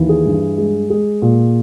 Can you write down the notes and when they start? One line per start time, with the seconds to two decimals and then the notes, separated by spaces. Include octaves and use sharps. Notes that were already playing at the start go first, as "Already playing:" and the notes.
Already playing: D#2 E3
0.09 G#4
0.26 G2
0.58 G#3
0.90 G#3 G#4
1.22 A#2